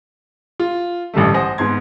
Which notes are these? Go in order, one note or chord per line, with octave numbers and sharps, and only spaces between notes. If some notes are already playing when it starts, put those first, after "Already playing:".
F4
A1 G2 D3 G3 A3
C5 F#5 G#5 D#6 A#6
G#2 B3 C6 G#6